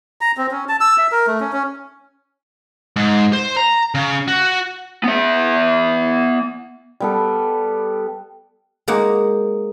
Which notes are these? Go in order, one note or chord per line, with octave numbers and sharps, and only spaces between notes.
A#5
C4
C#4
A5
E6
E5
A#4
A3
C#4
C#4
G#2
C5
A#5
C#3
F#4
B3 E5
G3 B3 A4
G#3 A#3 D#4 F#5